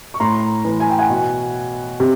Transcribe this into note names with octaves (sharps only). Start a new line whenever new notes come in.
C#6
A2 A#5 C6
E3
G#5
G5
F#5 G#5
B2
C3